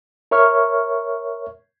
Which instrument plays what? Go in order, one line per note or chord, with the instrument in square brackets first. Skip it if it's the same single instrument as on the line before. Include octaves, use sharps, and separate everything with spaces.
[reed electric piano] A#4 C#5 E5 C#6 F6